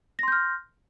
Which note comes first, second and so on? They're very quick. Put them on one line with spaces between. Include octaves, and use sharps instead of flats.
A#6 C6 G6 F6